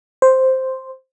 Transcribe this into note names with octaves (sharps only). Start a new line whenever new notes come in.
C5